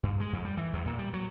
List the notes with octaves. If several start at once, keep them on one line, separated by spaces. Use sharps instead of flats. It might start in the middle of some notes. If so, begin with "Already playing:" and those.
G2
G#3
F2
G3
E3
E2
A#2
G3
F#3